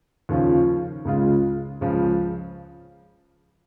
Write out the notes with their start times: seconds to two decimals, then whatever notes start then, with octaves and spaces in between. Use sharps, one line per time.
0.29 D#2 C#3 F3 C#4 F4
1.05 C#2 C#3 G#3 F4
1.81 C#2 C#3 F3